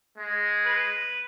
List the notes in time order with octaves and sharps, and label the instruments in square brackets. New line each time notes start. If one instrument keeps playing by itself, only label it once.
[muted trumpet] G#3
[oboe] B4